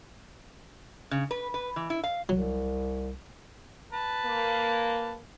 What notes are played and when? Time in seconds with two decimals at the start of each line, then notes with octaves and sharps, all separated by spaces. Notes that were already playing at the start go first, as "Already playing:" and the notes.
1.11 C#3
1.31 B4
1.54 B4
1.76 E3
1.90 E4
2.04 F5
2.29 C2 F#3
3.93 B4 A5
4.25 A#3